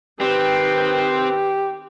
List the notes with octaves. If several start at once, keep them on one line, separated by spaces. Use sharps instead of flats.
D#3 C4 G4 B4